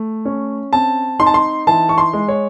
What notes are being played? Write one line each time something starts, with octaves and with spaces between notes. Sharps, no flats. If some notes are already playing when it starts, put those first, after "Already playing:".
Already playing: A3
C#4
C4 A5
D#4 C6
A5
C6
E3 A5
C#6
C6
G#3
C#5